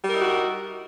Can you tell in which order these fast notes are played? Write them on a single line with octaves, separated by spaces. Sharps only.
G3 A#4 E4 D#4 F#4